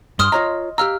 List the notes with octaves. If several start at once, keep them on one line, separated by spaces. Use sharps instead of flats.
G2 C6 D#6 F6
F4 C#5 D#5 A#5
G4 F5 A#5 E6 F6